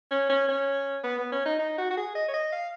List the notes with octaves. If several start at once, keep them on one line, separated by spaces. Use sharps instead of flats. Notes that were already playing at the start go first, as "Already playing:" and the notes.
C#4
C#4
C#4
B3
B3
C#4
D#4
D#4
F#4
F#4
G#4
D#5
C#5
D#5
F5